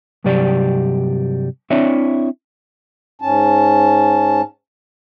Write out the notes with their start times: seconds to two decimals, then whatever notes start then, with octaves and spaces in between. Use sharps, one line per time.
0.24 G2 C3 F#3 G4 D5
1.70 C4 D4 E4 C#5 D5 E5
3.22 G#2 C#4 A5